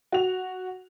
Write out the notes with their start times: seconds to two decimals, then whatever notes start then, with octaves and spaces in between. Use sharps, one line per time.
0.12 F#4 F7